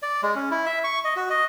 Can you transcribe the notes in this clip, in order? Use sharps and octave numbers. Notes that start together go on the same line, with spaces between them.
D5
G#3
C#4
E4
E5
C#6
D#5
F#4
D#5